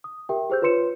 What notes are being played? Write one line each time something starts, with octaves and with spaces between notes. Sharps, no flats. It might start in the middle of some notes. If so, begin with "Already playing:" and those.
D#6
G4 A#4 E5 G5
G4 G#4 C5 E6 G6
F4 B4 C#5 C6 C#7 E7